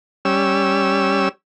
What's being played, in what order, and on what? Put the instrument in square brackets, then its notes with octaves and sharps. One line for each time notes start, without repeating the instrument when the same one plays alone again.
[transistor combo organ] G3 C#4 E6